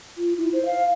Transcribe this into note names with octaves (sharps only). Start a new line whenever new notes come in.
F4
E4
C5
F5